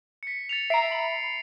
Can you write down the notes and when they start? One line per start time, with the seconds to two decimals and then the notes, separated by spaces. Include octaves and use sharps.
0.23 B6 C#7
0.49 A6 C#7 F7
0.70 E5 A#5 C7 D7
0.91 B5